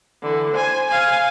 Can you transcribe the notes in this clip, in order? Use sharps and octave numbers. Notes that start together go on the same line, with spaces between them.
D3 E3
C5 G#5
F5 G#5